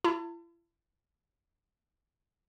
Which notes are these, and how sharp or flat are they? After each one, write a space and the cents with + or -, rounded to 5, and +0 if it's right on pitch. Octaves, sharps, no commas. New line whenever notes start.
E4 +45 A5 +40